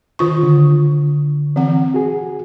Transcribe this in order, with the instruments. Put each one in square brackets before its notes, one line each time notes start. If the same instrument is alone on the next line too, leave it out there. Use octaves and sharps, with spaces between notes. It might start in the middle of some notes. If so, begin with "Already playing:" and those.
[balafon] D#3 F4 C#6
[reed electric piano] D3
[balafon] E3 C4 F#5
[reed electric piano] F#4 G#4